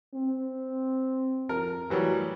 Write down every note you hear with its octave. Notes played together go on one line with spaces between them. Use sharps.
C4
F2 A#4
A2 E3 F#3 G3